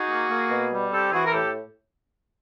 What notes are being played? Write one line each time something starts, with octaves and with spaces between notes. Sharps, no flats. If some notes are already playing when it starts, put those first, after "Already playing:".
Already playing: D#4 F#4 G#4
A#3
A#3
B2
G3
C4 G4 A4
E3 F#4 G#4
A#4
A2 G4 A4